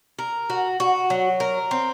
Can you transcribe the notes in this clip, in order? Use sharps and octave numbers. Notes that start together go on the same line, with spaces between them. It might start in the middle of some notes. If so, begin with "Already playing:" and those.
A#4
F#4
F#4
F#3
A#4
C4